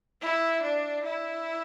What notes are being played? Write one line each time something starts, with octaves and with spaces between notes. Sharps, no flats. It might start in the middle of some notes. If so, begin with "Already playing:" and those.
E4
D4
E4